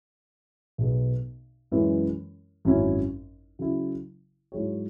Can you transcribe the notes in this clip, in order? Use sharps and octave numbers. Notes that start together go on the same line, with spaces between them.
B1 B2 B3 G#4
F#2 E3 G#3 C#4 E4
G#1 F#2 F#3 C#4 E4
C#3 F#3 E4
G#2 F#3 E4 G#4 C#5